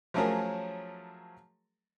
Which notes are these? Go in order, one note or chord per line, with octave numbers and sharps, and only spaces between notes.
F3 F#3 A3 C#4 G#4 A#4